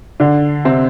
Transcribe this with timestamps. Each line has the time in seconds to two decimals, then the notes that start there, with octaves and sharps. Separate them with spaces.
0.20 D3 D4
0.65 C3 C4